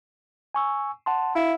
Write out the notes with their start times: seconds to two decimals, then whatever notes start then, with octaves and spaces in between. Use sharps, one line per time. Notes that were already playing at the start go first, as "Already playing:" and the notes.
0.55 G#5 C#6 E6
1.06 F#5 A5 C6
1.35 E4 F5